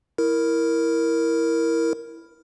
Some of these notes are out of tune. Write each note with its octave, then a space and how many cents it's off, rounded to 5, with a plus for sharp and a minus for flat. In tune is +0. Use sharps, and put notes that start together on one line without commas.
E4 +0 A#4 +0